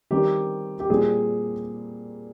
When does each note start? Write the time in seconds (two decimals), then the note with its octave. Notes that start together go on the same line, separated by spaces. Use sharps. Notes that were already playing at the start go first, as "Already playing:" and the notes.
0.11 D#3 G3 C4 G4
0.80 G4
0.90 A#2 G3 C4 G#4